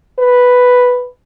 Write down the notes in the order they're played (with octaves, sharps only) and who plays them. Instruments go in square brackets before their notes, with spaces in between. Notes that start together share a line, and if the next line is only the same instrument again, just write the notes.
[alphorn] B4